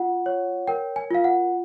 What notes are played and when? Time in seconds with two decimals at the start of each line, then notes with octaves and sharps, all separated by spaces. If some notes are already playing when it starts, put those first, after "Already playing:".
Already playing: F4 F#5
0.26 C#5
0.68 A#4 G5
0.96 G#5
1.11 F4 F5
1.24 F#5